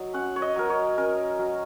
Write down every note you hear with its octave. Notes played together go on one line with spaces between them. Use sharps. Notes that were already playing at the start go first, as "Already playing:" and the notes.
Already playing: F#3 D#4
C#4 F#5
C#5
D#5
F#3 A#4
C#5
C#4 A#4
F#3